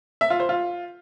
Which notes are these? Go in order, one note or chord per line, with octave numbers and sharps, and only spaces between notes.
E5
F4
C5
F4